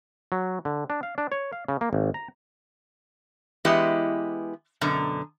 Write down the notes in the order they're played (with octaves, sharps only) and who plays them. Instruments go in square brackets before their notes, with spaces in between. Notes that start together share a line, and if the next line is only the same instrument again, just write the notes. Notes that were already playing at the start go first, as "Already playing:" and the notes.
[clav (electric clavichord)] F#3
D3
D4
F5
D4
C#5
F5
C#3
A#3
G#1
A#5
[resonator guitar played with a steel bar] E3 G#3 B3 E4 G4 D#5
F#2 B2 D3 A#5